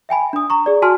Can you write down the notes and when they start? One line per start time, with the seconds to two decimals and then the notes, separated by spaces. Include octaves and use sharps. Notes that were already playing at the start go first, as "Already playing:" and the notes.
0.09 E5 G5 G#5 B5
0.33 D4 D#6
0.50 A#5 C#6
0.66 G#4 D5
0.82 F#4 G#5 A5 C6 F6